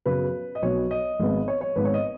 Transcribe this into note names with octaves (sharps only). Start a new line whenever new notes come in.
F#2 C#3 F#3 B3 B4
D#5
B1 B2 B3 C#5
D#5
G#1 G#2 G#3 B3
C#5
C#5
G#1 G#2 G#3 B3 B4
C#5
D#5